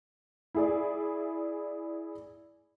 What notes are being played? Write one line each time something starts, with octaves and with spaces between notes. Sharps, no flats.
E4 G#4 D5